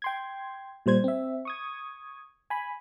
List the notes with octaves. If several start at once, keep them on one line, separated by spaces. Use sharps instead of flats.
G5 C6 G#6
A#2 G3 C5 G#6
C4 E5
C#6 D#6 G#6
G#5 B5